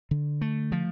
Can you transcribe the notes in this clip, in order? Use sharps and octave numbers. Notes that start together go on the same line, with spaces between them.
D3
A3
F3